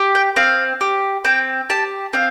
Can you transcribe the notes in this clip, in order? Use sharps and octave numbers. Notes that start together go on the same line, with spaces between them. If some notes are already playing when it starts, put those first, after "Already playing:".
Already playing: G4
G5
C4 F5
G4
C4 G5
G4 A5
C4 F5